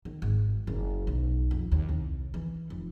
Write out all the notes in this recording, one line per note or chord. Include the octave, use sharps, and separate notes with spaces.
D#3
G#1
F#1
B1
F2
D#2
C2
E3
F1